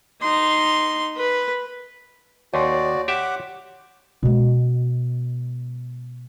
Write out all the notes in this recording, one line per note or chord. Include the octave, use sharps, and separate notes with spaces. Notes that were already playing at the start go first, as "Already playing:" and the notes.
D#4 C6
B4
D#2 F#4 C#5 D5 C6
G4 E5 F#5 D6
B2 G#3